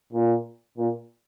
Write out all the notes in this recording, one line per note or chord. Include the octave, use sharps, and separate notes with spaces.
A#2
A#2